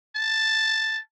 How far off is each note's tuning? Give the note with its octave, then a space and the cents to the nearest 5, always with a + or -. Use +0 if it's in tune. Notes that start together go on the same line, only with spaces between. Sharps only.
A5 +5